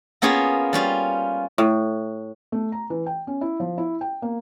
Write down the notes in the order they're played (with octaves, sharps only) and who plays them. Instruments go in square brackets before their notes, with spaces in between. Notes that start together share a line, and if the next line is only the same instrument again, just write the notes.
[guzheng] A#3 B3 C#4 F4 G#4
G3 C#4 F4
[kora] A2
[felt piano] A3
A#5
E3
G5
C#4
E4
F3
E4
G5
A#3